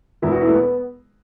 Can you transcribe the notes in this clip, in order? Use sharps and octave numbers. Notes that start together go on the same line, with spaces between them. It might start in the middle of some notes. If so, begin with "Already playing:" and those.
E1 E2 E3 E4
F#4
B3 E4
A3
B3